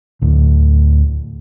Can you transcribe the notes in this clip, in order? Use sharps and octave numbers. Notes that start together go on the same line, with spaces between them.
D2 A2